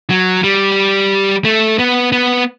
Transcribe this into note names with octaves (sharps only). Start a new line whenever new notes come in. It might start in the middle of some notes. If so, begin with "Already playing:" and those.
F#3
G3
A3
B3
B3